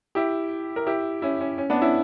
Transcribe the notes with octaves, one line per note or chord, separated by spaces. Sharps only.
E4 G4
A#4
E4 G4
C#4 E4
C#4
C#4
B3 D4
C#4 E4